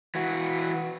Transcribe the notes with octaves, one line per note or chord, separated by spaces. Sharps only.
E3 F#4